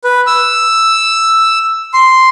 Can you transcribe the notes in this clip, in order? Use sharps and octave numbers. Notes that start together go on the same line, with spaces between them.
B4
E6
C6